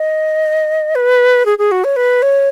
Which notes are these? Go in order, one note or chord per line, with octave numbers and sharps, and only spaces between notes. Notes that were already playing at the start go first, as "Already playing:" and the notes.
Already playing: D#5
B4
G#4
G#4
F#4
C#5
B4
C#5